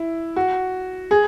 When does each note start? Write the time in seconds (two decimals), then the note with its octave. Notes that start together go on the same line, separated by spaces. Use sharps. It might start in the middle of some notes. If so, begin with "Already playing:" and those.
Already playing: E4
0.36 F#4
1.11 G#4